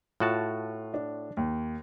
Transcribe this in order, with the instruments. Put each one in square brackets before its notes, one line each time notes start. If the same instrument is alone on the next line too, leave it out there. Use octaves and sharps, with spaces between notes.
[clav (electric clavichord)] A2 F#4 A5 [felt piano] F4
[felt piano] D4
D#2